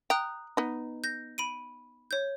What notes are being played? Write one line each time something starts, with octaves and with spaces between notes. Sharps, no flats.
G5 A#5 D#6 F#6
B3 D#4
G6 A#6
B5 D7 D#7
C#5 G6